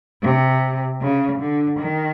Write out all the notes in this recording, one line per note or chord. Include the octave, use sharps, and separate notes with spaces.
C3
C#3
D3
D#3